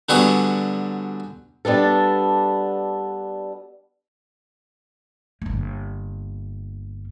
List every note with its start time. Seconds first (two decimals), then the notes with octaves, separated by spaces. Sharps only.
0.09 D3 F#3 G3 B3 F#4 G#4
1.65 G3 B3 D4 A4
5.42 G1 A#3